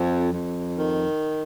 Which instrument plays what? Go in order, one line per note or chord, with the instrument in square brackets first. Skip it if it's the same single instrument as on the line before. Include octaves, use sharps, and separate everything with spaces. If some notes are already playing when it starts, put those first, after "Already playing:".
Already playing: [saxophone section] F2
F2
D#3